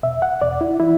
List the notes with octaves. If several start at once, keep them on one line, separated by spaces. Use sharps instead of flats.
E2 B2 E5
F#5
E2 B2 D5
E4
E3 E4